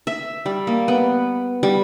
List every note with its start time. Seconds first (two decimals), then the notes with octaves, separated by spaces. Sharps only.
0.07 E5
0.46 G3
0.67 A#3
0.88 B3
1.63 G3